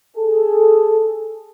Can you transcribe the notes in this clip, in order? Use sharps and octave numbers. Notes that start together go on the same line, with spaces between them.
G#4 A4